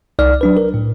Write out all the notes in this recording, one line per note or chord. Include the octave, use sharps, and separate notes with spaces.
C2 D#4 D5 F6
F#3 D4 B4
A#4
A2